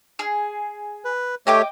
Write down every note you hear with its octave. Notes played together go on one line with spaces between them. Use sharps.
G#4
B4
A3 G4 C#5 D#5 G5 D6